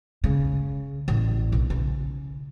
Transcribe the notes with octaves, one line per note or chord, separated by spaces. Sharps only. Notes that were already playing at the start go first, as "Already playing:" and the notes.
C#3
A1
B1 D3
C#3